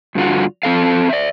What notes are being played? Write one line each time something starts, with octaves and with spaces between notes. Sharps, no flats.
G2 D3 F4 F#4
F3 C4 A4 F5
D5 E5